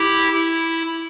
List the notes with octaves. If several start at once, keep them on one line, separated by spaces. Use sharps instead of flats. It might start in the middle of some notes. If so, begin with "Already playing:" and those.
Already playing: E4 G4
E4